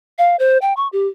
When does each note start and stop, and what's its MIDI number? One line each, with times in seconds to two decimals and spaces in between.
0.18 0.36 77
0.39 0.58 72
0.62 0.73 79
0.77 0.88 85
0.93 1.08 67